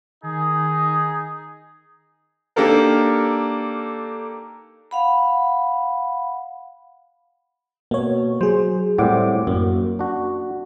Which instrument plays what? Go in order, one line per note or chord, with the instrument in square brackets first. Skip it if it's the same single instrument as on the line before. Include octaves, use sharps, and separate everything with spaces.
[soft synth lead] D#3 [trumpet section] D#4 G#4
[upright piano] A#3 D4 D#4 G4 A4 A#4
[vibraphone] F5 F#5 B5
[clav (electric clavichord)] B2 [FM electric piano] A#3 C#5
[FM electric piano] F#3 G#4 [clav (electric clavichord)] C5
[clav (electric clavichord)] A2 G3 C4 [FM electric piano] F#5 D6
[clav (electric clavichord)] F#2 [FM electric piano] A#3
[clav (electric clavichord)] D4 F#4